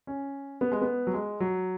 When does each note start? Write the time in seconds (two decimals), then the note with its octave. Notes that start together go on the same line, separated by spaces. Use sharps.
0.07 C#4
0.61 B3
0.72 G#3
0.81 B3
1.07 F#3
1.14 G#3
1.40 F#3